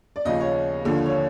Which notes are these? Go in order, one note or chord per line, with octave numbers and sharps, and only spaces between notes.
D5
D#2 C#3 F3 D#5
C#5
D#2 D3 F3
C#5